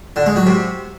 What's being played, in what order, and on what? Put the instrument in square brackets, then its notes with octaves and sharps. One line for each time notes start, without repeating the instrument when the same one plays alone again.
[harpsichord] D3
G#3
F#3
C3